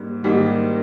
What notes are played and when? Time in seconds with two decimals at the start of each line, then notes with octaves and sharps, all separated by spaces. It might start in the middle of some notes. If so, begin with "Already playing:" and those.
Already playing: G#2 G3 A#3
0.23 G#2 D#3 G3 A#3